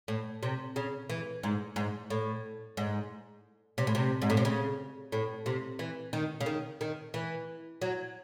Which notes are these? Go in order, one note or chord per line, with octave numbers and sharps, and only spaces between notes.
A2
C3
C#3
E3
G#2
G#2
A2
G#2
C3
A2
C3
G#2
A2
C3
C#3
A2
C3
E3
D#3
C#3
D#3
D#3
E3
F#3